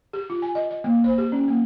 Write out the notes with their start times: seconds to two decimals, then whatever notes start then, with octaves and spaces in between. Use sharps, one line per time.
0.13 G4
0.30 F4
0.42 G#5
0.55 D#5
0.70 D#5
0.84 A#3
1.04 C5
1.18 G4
1.32 C#4
1.48 A#3